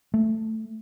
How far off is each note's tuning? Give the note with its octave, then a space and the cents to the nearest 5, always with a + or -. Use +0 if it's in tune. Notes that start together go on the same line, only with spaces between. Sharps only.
A3 +5